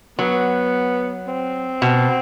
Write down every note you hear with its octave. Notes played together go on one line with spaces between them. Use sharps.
F#3 B3
C4
B2